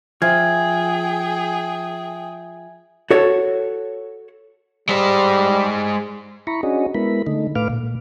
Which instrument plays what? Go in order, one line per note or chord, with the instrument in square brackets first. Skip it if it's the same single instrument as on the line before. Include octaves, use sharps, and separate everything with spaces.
[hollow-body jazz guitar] F3 [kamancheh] G#4 G5 [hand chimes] E5 G#5 G#6
[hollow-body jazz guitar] F#4 A4 C#5
[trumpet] G3 [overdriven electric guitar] G#3 C5
[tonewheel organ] E4 A#5 B5 C#6
C#4 D4 F#4 G#4 D#5
G#3 B3 E4 A#4 B5
D3 A3 D#4
A2 A3 B4 F5 D6 F6
A#2